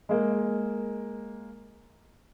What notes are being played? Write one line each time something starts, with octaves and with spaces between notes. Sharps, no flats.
G#3 A#3